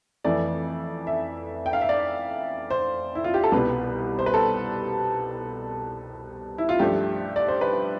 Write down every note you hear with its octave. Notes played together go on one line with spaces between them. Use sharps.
F2 E3 A3 D5
E5
G5
F5
E5
D5
C5
E4
F4
G4
A4
C2 B2 G3 B4
C5
B4
A4
E4
F4
G2 F3 A3 G4
D5
C5
B4